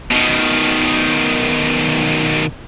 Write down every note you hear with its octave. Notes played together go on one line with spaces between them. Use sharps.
B2 D#3